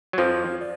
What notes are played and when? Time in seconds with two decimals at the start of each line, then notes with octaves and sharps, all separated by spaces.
0.13 F#3
0.18 F2 F3 C5
0.61 D5